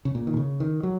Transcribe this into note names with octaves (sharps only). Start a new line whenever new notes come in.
C#3
A#2
D#3
C#3
D#3
F#3